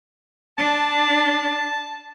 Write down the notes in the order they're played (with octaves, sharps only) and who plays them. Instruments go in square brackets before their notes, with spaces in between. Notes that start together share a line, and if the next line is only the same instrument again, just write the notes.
[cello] D4 [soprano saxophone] A5